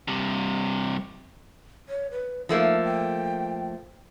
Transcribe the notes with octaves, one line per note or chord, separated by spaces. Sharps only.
G2 C3
C#5
B4
F3 A3 A#3 D#4
G5